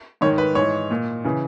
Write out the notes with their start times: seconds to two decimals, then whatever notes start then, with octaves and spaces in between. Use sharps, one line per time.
0.21 G#2 D#3 C#5
0.38 B4
0.55 G#2 E3 C#5
0.91 A#2
1.24 C#3 E3